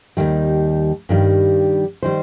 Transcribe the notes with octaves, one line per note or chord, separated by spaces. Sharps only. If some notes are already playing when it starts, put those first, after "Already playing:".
D#2 D#3 G3
G2 D#3 G3
D#3 G3 C5